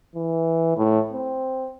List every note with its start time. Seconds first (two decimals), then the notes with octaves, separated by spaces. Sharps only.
0.15 E3
0.77 A2
1.13 C4